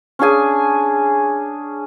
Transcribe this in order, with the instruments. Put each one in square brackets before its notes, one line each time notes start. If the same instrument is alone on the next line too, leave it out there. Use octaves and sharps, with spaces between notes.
[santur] C#4 D4 G#4 G#5